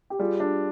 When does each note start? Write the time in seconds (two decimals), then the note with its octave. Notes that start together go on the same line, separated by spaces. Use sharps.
0.10 G4
0.19 G3 F4 G#4
0.40 D4